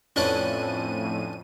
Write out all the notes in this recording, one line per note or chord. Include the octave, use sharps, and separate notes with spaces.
F2 A2 C#4 D4 B4 D#7